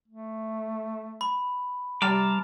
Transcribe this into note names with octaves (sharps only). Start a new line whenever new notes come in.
A3
B5
C3 G3 A5 A#5 D6 F6